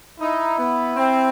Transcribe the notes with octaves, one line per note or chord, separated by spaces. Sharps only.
D#4 E4
B3
C4